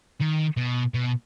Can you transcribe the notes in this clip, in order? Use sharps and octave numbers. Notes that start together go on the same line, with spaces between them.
D#3
B2
B2